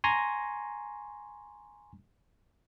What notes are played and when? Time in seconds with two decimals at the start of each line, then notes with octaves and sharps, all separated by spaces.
0.04 G#5 A#5 C6 C#6 A#6